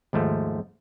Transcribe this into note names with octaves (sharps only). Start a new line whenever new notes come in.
D#2 G#2 F3 A3